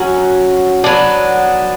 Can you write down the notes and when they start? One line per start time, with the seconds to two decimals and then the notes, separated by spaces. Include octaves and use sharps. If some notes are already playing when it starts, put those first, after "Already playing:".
Already playing: F#3 C#4 F#4
0.84 F#3 B3 D4